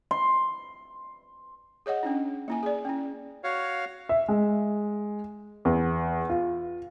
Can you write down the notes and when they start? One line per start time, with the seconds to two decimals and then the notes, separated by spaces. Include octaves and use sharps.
0.11 C6
1.86 G#4 C#5 D#5 F#5
2.03 C#4 D4 E4
2.48 A#3 E4 G#5
2.63 G#4 D5
2.85 C#4 E4
3.44 F#4 C#5 F5
4.09 E5
4.28 G#3
5.65 E2
6.29 F4